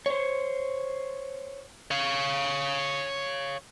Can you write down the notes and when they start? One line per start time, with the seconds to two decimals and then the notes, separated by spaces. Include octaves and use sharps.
0.06 C5 C#5
1.91 C#5 F5